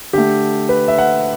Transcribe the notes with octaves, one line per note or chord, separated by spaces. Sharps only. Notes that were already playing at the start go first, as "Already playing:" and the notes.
D3 A3 G4
B4
E5
F#5